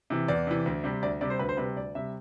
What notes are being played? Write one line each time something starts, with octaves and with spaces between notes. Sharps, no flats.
C3 E3
E2 D5
C3 E3
D2
C3 G3
D2 D5
C3 G3 D5
C5
D2 B4
C5
C3 G3 B4
D2 D5
C3 G3 E5